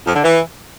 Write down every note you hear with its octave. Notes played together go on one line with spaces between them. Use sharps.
F2
D3
E3